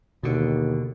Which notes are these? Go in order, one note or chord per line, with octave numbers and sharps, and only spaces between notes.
D#2 B2 D3